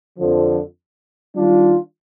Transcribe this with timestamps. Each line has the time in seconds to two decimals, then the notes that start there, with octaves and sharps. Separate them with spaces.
0.18 F2 D3 F3
1.36 D#3 G3 D4 F4